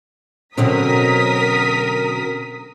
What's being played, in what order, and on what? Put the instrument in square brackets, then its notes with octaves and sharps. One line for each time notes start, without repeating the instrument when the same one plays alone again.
[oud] B2 D3 F#3 [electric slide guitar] C4 C#4 [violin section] A#4 D#6 B6